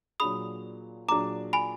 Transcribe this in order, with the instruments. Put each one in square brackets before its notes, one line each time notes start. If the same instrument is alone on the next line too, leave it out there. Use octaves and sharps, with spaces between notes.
[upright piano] A#2 F#3 D4 G#4 [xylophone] B5 D#6
[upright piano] A#2 F#3 D4 G#4 [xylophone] A#5 D6
[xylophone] G#5 B5